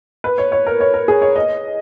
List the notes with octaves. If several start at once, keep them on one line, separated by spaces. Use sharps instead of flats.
B4
C#5
C#5
A#4
C#5
A#4
G#4
C#5
D#5